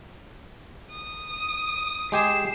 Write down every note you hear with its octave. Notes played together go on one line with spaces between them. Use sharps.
D#6
G#3 G4 G#4 C7 E7